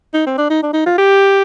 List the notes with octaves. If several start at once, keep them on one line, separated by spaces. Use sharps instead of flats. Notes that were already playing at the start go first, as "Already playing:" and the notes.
D#4
C4
D4
D#4
D4
D#4
F4
G4